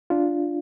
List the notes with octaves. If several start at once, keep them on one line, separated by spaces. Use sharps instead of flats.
D4 F4